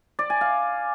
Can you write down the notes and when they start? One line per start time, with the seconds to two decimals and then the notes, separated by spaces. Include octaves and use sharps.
0.19 D5
0.30 G#5
0.41 F5